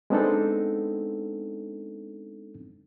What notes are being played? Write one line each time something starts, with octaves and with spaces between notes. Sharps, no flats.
G#3 B3 C4 D4 D#4 A4